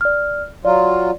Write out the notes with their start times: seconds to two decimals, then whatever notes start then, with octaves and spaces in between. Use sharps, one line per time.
0.01 D5 F6
0.65 F#3 F4 D5